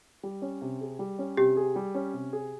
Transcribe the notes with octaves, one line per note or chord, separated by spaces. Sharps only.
G3
C#4
C3
G#4
G3
C#4
C3 G4
G#4
G3
C#4
C3
G#4